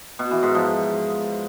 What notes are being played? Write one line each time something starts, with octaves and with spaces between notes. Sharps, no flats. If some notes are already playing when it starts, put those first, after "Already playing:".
B2
E3
G#2
F3